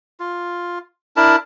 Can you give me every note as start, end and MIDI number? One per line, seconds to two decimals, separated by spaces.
0.20 0.79 65
1.16 1.36 62
1.16 1.36 64
1.16 1.36 70
1.16 1.36 81